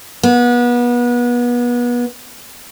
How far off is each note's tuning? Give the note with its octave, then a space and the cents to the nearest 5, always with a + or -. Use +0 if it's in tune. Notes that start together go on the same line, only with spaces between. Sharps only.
B3 -30